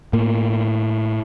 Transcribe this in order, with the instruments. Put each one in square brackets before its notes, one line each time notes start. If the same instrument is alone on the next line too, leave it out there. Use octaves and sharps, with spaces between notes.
[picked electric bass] A2 A#3